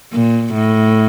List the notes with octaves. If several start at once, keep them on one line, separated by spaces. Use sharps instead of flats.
A#2
A2